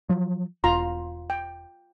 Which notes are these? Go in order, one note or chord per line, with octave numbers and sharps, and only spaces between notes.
F3 F#3
E1 F4 A#5 C6
G5